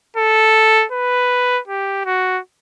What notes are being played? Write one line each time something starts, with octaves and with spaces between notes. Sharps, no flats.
A4
B4
G4
F#4